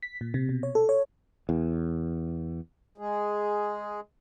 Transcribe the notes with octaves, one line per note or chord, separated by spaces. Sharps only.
B6
A#2
C3
B2
C#5
A4
C#5
E2
G#3 G#4